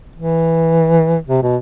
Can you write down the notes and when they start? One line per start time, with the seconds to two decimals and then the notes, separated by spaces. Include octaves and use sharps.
0.16 E3
1.28 C3
1.43 B2